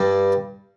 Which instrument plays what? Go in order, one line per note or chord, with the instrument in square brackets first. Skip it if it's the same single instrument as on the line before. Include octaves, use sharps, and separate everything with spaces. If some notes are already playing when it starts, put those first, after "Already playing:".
Already playing: [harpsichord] G2 G3